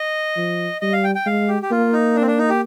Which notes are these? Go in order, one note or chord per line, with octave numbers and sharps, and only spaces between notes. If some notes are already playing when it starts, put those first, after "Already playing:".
Already playing: D#5
F3
G3 D#5
F5
G5
G5
G#3 F5
G4
G4
A#3 F4
D#4
D4
C4
D4
D#4
G4